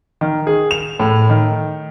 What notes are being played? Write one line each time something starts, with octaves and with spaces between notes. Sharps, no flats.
D#3
G#4
F7
A2
D#3